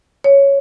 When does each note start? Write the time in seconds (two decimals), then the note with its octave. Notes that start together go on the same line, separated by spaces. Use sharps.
0.24 C#5